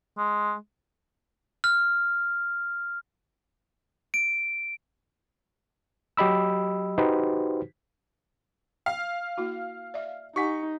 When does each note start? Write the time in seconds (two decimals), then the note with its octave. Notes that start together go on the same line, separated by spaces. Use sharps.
0.17 G#3
1.64 F6
4.14 D7
6.17 F#3 G4 D#5 B5 E6
6.98 D#4 F#4 G4 B4 C5
8.86 F5
9.38 A#3 E4 F#4
9.94 D5 E5
10.36 D#4 G4 F#5 G#5 C#6 B6